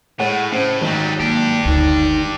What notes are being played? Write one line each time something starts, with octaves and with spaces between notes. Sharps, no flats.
A2 G#3 C#5 F#5
A2 C#3 C5
G#1 D#3 F#3 G3 D#5
F#3 A#3 D4 G4
F#1 D2 D#4